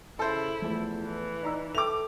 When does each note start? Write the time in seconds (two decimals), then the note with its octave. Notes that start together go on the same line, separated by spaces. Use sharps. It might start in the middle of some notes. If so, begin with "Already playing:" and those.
0.19 C#3 E4 A4 C5 E5 A5
0.62 E2 F3 A3
1.04 E3
1.43 D#4 D5 A#5 E6
1.75 A4 E5 G5 D6 F7